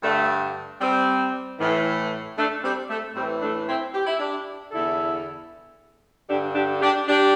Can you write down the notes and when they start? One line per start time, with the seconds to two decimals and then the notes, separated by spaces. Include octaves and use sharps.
0.02 G2 D3 A3
0.80 G3 C4
1.59 A2 E3
2.37 A3 D4
2.63 G3 C4
2.89 A3
3.15 A2 G3 C4
3.20 E3
3.42 A3 D4
3.67 C4 E4
3.94 G4
4.06 E4
4.19 D4 G4
4.71 E2 D3 E4 A4
6.28 G2 D3 D4 G4
6.54 D4 G4
6.81 D4 G4
7.07 D4 G4